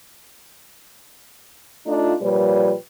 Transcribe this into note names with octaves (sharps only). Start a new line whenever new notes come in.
A3 D4 D#4 F4
A#2 F3 G3 B4 C#5